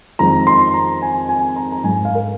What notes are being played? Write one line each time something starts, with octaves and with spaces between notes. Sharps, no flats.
F2 D#3 G#3 A#5
C6
A#5
G#5
G#5
A#5
A#5
G#2 G#3 G#5
F5
A#4